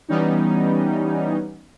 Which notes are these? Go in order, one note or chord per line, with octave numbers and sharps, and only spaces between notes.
E3 G3 B3 C#4 D#4